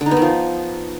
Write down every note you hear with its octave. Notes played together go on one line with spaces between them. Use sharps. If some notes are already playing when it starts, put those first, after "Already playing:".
D3
D#4
B3
D#3
F3